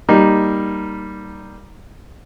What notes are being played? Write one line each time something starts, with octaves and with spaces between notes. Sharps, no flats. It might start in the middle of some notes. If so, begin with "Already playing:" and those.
G3 A#3 D#4